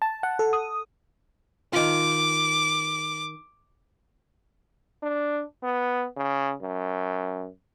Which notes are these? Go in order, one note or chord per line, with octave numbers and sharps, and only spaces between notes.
A5
F#5
A4
D#6
D#3 F4 D6
D4
B3
C#3
F#2